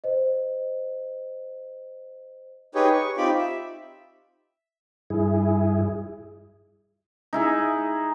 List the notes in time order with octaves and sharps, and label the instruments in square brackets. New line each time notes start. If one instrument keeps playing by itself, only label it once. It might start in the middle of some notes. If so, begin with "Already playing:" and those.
[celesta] C5 D#5
[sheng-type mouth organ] D#4 G4 G#4 B4 C#5
C#6
C4 D#4 F4 G4 B5 D6
E5
[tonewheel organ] G2 E4 G#4
[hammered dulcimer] D#4 E4 G#4